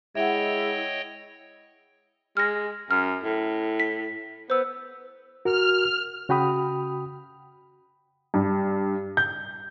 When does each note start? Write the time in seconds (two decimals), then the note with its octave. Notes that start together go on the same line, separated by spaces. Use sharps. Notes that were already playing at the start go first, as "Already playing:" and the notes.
0.15 G#3 E4 C#5 D#5 E5 F#5 G5
2.37 G#3 F6 A#6
2.91 F#2 F6
3.24 A2
3.80 B6
4.50 B3 C5 E6
5.45 F#4 A#4 F6
6.29 C#3 F#4 G5 B5 D#6
8.34 G2
9.17 G6